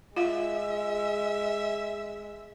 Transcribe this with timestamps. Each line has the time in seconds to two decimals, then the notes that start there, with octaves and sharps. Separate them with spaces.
0.16 G#3 F4 E5 F5